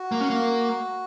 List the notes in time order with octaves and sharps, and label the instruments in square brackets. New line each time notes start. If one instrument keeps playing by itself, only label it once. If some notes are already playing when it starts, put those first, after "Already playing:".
Already playing: [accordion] F#4
[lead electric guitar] A#3
C#4
A#3